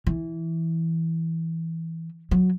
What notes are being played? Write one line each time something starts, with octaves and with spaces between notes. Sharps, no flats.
E3
F#3